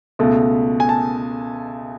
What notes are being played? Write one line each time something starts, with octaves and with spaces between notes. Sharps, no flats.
C#2 B2 A3
G#5
A5